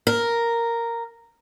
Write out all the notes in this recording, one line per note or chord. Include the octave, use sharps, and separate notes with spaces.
A#4